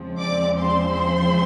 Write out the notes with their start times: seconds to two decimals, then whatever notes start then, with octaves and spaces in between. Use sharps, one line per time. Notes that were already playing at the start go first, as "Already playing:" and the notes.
Already playing: E2 C#3 F3 G#3 C4
0.18 D5 D6
0.58 C5 C6